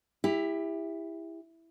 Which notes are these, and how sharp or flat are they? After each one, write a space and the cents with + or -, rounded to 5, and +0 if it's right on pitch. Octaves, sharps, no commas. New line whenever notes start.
E4 +0 G4 +30